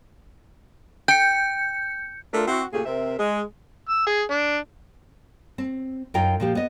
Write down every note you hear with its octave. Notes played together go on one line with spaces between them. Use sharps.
G5 G6 C#7
A3 D4 F4 A#4
C4 E4 F#4
A#2 C#3 A3 G4 G#4
C3 C4 A#4 E5
G#3
E6
G#4
D4
C4
F#2 D#4 F4 A#4 G5
A#2 F3 G4
B3 D#5